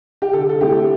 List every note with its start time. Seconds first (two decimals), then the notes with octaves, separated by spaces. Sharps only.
0.22 G4
0.33 D3 A4
0.49 A4
0.61 A3 C4 E4 G4